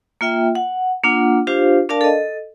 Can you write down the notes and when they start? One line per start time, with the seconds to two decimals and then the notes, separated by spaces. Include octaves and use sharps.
0.21 A#3 F4 E5 G5
0.55 F#5
1.03 A#3 D4 F4 F#5
1.47 D4 F4 G4 C5 F5
1.89 D4 A#4 D5 F5 A5
2.01 A4 D#5